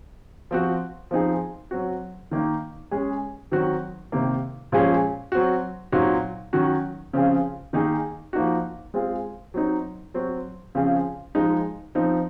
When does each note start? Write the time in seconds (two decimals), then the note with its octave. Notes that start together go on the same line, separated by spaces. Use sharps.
0.51 F3 C4 F#4
1.11 F3 C4 D#4 G#4
1.71 F#3 C4 F#4
2.31 D#3 A#3 D#4
2.91 G#3 C#4 G#4
3.51 D#3 F#3 C4 F#4
4.12 C3 D#3 A#3
4.72 A#2 F3 G#3 C#4 G#4
5.32 F#3 C4 F#4
5.92 A#2 F#3 C4 D#4 F#4
6.53 D#3 F#3 C#4 F#4
7.13 C#3 F3 C4 F4 G#4
7.73 D#3 A#3 D#4 G#4
8.33 F3 A#3 D#4 F#4
8.94 G#3 C4 F4 G#4
9.54 F#3 C4 D#4
10.14 F#3 C4 F#4
10.75 C#3 F3 C4 F4 G#4
11.35 F3 G#3 D#4
11.95 F3 C4 D#4